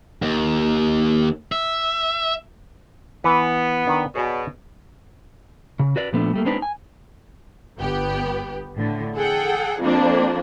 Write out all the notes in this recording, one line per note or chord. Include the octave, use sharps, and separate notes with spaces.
D#2
E5
E3 B3
D#3 D4
B2 G#4 C#5 D5
C#3
F#4 B4 D5
A#2 F3 A3 B3 D4
G3 A3 A#3
G#3 B3 C4 D4 D#4 B4
G#5
G1 B3 G4
A2 D3
G#4 A4 F#5 G5
F2 F3 A#3 C4 D4